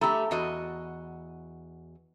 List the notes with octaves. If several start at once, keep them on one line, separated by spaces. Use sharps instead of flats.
A3 G4 A#5 B5 E6
E2 F#4 D#5